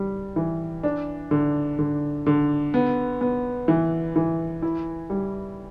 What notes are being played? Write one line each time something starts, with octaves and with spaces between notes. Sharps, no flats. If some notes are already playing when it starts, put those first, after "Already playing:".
Already playing: G3
E3
D4
D3
D3
D3
B3
B3
E3
E3
E4
G3